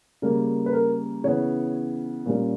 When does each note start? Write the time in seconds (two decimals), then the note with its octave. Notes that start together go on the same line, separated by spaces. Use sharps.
0.22 C#3 G3 A#3 A#4
0.66 B4
0.73 A#4
1.24 C#3 E3 B3 C#5
2.26 A#2 G3 C#4